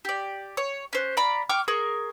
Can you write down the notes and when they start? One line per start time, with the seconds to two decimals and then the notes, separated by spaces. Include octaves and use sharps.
0.05 G4 D5
0.57 C#5
0.93 C#4 C5 F#6
1.17 D5 F5 A#5 B5
1.49 G5 C#6 D6 F6
1.68 G#4 A#4 C#6